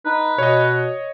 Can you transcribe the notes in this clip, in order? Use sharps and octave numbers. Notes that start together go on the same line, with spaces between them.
D#4 B4
B2 C#5 D#5